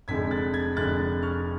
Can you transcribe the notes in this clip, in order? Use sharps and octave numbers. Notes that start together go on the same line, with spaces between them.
F1 F2 D3 G#3 G#6 B6
F#6 A6
G#6 B6
F1 F2 D3 G#3 F#6 A6
C#6 F6